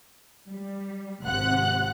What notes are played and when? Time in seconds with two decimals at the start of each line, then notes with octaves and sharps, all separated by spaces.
0.47 G3
1.24 G#1 C3 F#5 F#6